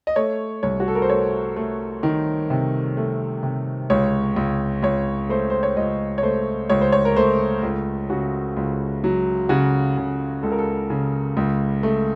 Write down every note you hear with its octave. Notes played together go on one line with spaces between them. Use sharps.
D#5
A3 C#5
C2 C#5
F#4
A4
A#4
C5
A3 C#5
A3
D#3
C3
A3
C3
C#2 C#5
C#2
C#2 C#5
A3 C5
C5
C#5
C#2 D#5
C#5
A3 C5
C#2 C#5
C5
C#5
A#4
A3 C5
C#2
C#3 F#4
C#2
F#3
C#3 F#4
C#3
C#2 A4
A#4
A4
C#3
C#2
A3